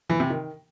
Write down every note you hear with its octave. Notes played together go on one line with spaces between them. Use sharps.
E3
C3
D#3